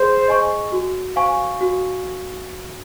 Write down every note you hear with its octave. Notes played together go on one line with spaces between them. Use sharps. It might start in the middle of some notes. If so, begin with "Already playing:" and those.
Already playing: G#4 C5
D#5 G#5 C#6
F#4
C5 F5 G#5 C#6
F#4